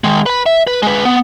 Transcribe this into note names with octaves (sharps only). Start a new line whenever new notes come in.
D#3 G#3
B4 B5
E5
B4
G#3 B4
B3